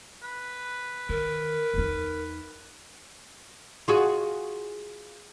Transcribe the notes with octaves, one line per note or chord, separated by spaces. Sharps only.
B4
D#3 A#4
E2 D#4
F4 F#4 G#4